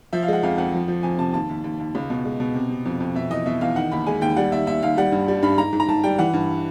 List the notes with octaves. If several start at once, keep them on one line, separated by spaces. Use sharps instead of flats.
F3 E5
F5
G#3 F#5
F2 F5
F2 F#5
F3
F3
F2 G#5
C3 A5
D#2 A5
D#2
D#2
D#2
C#2
B2
G#3
B2
C3
C3
F2
F2
B2 E5
E2 D#5
B2 E5
E2 F5
D#3 F#5
D#2 B5
G#3 G#5
D#2 G5
G3 F#5
D#2 E5
D#2 E5
D#2 F5
G3 F#5
G2
G3
G2 B5
G#2 A#5
G#2
A#5
G#2 A5
G3 G5
E3 F#5
G2